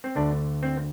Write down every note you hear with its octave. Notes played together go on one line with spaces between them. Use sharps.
C4
D2 D3 D4
C4